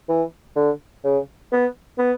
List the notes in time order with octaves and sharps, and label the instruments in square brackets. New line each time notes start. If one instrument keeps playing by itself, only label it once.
[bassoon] E3
D3
C#3
B3
B3